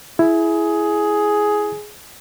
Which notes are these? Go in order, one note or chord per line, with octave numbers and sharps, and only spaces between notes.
E4 G#4